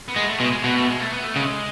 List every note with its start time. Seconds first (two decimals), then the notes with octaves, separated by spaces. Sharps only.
0.08 B3
0.16 G#3
0.24 A3
0.40 B2 G#3
0.52 G#3
0.64 B2 B3
0.76 A3
0.88 G#3
1.00 A3
1.13 B3
1.24 A3
1.36 C#3 G#3